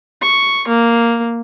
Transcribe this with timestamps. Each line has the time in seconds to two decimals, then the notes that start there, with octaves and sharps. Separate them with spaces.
0.22 C#6
0.68 A#3